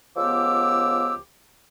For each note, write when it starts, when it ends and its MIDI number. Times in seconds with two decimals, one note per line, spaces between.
0.17 1.14 37
0.17 1.14 53
0.17 1.14 59
0.17 1.14 67
0.17 1.14 86
0.17 1.14 88